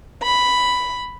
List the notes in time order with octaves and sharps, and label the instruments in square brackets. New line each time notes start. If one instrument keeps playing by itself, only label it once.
[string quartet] B5